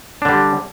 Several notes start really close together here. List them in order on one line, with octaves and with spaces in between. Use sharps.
D4 D3 G3